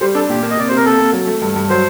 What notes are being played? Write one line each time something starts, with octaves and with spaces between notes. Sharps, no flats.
G3 C5
D4 A4
A#2 G4
A#3
D#5
C3 D5
C3 C5
A#4
A#3 A4
A#3
F#3
A3
G2
G2
F#3 C5